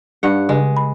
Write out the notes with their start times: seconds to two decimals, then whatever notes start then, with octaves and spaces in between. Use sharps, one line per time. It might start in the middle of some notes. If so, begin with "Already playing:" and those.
0.23 G2 F#5
0.49 C#3 G#3
0.77 B5